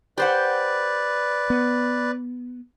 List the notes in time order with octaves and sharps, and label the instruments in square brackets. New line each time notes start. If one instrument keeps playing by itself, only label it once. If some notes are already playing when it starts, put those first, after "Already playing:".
[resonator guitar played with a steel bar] G4 C5 F#5 [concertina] B4 D5
[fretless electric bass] B3